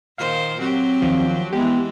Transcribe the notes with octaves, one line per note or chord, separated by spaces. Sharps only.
A#2 D#3 C5 F5
F#3 C4 G4
D#2 F3
E3 G#3 B3 G4